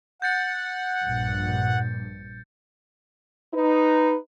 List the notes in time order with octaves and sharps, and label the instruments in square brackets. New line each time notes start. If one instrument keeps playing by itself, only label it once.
[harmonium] F#5 [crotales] G6 A6 C#7
[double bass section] A#1 G2
[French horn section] D#4 B4